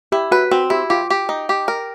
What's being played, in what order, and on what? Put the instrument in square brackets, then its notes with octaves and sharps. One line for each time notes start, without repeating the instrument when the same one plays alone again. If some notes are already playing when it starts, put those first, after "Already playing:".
[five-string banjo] E4 [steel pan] G4
[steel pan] F#4 [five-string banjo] B4
[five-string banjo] C4 [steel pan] F#4
[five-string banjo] E4 [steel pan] G4
[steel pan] F4 [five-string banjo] G4
[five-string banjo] G4
D#4
G4
A#4